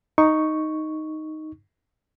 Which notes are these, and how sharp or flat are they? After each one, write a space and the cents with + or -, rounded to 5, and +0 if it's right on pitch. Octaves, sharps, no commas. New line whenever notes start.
D#4 +0 C#6 +0